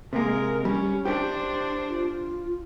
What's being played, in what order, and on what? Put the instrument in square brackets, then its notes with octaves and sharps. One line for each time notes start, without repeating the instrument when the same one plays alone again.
[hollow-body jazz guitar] C3 A#3 [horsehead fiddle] G#3 A#4
[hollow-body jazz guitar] G3 [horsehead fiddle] C#4
[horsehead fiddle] D4 C5 [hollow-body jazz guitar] G4
[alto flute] F4